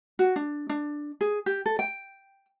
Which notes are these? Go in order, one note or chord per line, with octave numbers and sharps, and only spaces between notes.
F#4
D4
D4
G#4
G4
A4
G5